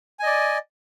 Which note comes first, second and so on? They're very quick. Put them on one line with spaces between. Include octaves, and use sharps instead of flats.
G#5 D#5 D5